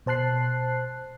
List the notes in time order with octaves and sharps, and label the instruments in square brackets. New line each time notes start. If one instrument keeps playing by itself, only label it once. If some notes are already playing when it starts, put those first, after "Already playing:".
[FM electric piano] B2 C5 A5 F#6 C7